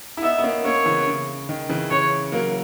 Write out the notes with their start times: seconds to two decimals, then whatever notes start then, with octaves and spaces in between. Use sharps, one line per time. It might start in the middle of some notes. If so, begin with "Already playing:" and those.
0.17 E4
0.22 B3 D#4 E5
0.38 B3
0.43 A#3 C#4
0.64 A#3 C#4 C#5
0.85 C#3 E3
1.07 C#3
1.49 D#3
1.69 C#3 E3
1.90 C#3 E3 C#5
2.32 F#3 A#3 A#4